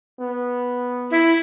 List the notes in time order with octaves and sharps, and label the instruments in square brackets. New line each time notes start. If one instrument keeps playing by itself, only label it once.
[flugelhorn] B3
[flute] E4